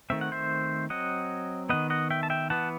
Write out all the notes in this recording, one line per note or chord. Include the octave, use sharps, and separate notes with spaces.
D#3 A3 C4 E5
F#5
C5 E5
F#3 C4 D#5 F#5
D#3 G3 B3 D#5 F#5
D#5 F#5
E5 G5
A5
E5 G5
E3 B3 F#5 A5